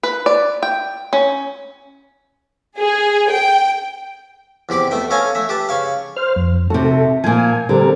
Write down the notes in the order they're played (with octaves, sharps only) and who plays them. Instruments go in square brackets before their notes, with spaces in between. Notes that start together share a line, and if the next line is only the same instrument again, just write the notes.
[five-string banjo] B4
D5
G5
C#4
[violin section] G#4
G5
[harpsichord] E2 C3 G4 B5 D6
B2 A3 G5
C#4 A4 C#5 F5 G#5 A#5
A3 E5
G4 B4 A5
C#3 C#5 F5
[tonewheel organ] C5 F6
F2
[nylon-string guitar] C3 F#4 [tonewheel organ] A4
[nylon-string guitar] A#2 F3 [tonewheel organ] G#5
[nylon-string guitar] D3 [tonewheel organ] G3 C4 A#4